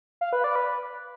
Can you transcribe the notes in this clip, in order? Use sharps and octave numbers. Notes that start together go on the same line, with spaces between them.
F5
B4
D5
B4